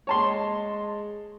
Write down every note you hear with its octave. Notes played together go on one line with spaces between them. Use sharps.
G#3 C#5 A5 C6